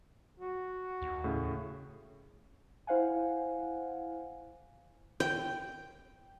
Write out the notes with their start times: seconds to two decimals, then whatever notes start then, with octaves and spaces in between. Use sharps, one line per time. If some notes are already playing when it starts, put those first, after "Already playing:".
0.40 F#4
1.02 D#2
1.24 A2 C#3
2.87 E4 C5 F5 F#5 G#5
5.20 G5